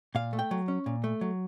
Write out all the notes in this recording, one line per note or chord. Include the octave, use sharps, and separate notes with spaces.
A#2 F5
A3
G5
F#3
C#4
A#2
A3
F#3